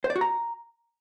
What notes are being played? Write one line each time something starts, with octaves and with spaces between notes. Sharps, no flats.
C5
D5
F#4
A#5